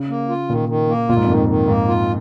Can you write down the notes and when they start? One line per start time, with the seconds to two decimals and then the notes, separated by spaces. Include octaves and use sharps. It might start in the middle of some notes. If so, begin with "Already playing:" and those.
Already playing: C#3
0.09 A#3
0.29 F4
0.49 A#2 D#3
0.69 D#3
0.89 A#3
1.09 A#2 F4
1.17 G#2
1.24 F2
1.29 G#2 D#3
1.48 D#3
1.68 G#2 A#3
1.88 F4